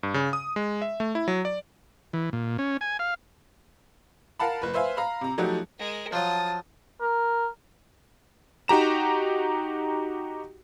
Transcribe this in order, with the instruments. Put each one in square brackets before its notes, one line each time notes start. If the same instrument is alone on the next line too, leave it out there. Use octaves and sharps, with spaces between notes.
[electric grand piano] G2
C#3
D#6
G#3
E5
A3
E4
F#3
D5
[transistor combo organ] E3
A#2
C#4
G#5
F5
[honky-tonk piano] A#4 F5 F#5 A5 B5
F#1 B4
B4 C5 E5 F5 G#5
F5 A#5 B5
C3 A#5
F3 F#3 A3 D#4 F#4 G4
[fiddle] G#3 A#4
[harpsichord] F3 F#3 [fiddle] F4 D#6 [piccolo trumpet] A5
[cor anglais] A#4
[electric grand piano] D#4 F#4 G4 A#5 E7